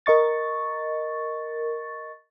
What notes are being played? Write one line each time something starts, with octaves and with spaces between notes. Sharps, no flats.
A#4 D#5 C#6 A6